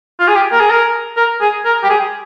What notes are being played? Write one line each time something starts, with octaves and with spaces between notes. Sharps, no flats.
F4
G#4
G4
A#4
G#4
A#4
A#4
G#4
A#4
G4
G#4